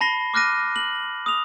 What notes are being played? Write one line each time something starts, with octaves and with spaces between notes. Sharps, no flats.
A5 B5 A#6 C7 G7
D6 F6 F#6 A#6 D#7
F#7
D#6 F7